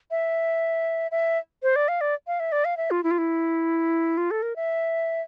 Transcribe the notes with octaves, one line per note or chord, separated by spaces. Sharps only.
E5
E5
C5
D5
F5
D5
F5
E5
D5
F5
E5
F4
E4
F4
E4
F4
A4
A#4
E5